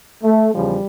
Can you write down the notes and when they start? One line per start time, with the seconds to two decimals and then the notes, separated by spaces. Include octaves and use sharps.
0.23 A3
0.55 E2 C#3 F3 G3